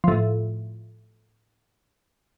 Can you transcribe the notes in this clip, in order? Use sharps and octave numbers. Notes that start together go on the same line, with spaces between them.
A2 F3